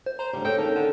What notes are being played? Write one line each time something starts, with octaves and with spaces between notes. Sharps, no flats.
C5
C5 A#5
D2 C#3 G3
G4 A4 C#5 D#5 G5
D#3 A#3 C#4 A5
D3